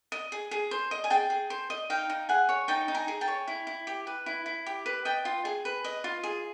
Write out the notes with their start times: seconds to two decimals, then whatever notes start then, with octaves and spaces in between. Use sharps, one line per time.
0.12 D#5
0.32 G#4
0.51 G#4
0.71 C5
0.91 D#5
1.04 G#5
1.10 G#4 G5 A5
1.30 G#4
1.50 C5
1.70 D#5
1.90 D#4 F5 G5
2.10 D#4
2.29 G#4 F#5 G#5
2.49 C#5
2.68 D#4 G5 A5
2.88 D#4
2.94 G#5 A#5
3.08 G#4
3.21 G5 A5
3.28 C#5
3.48 E4
3.67 E4
3.87 G4
4.07 B4
4.26 E4
4.46 E4
4.66 G4
4.86 B4
5.05 D#5 G5 A5
5.25 F4
5.45 G#4
5.65 B4
5.84 D#5
6.04 F4
6.23 G#4